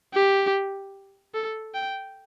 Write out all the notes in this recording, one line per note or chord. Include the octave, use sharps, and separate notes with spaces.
G4
A4
G5